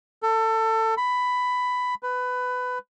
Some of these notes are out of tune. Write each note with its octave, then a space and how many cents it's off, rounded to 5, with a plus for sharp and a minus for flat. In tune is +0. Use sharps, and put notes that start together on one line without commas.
A4 +25
B5 +10
B4 +15